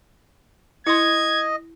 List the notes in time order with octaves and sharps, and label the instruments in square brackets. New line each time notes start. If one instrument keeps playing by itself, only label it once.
[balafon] E4 C6 [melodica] D#5 [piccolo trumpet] G#6